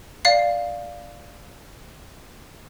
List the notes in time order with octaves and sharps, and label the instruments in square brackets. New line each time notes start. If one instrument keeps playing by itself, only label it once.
[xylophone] D5 F5 C7